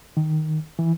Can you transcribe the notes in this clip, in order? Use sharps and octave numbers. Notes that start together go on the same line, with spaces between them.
D#3
E3